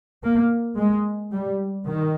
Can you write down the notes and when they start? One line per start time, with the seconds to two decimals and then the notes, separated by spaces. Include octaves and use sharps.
0.23 A#3
0.77 G#3
1.32 G3
1.86 D#3